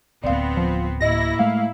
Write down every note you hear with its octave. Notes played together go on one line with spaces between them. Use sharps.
D1 G1 B3 C4 D5 F5
F3
A2 A#3 E4 D#5 A#6
G#3 A3 F5